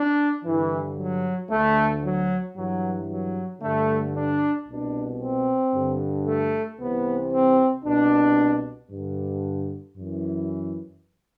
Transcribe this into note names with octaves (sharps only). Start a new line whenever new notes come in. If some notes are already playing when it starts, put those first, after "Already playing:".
Already playing: D4
G2 D3 E3
F#3
D2 D3 A3
F#3
G2 E3 F#3
F#3
G2 D3 A3
D4
C2 B2 D4
C4
G2 D3
A3
C2 C3 E3 B3
C4
C2 B2 D4
G2 D3
F#2 E3